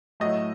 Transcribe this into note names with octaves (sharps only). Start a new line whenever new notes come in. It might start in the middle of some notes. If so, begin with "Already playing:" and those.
A2 F#3 A3 D#5